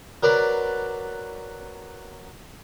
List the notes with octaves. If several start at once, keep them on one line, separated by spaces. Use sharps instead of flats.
F#3 A#4 B4 D5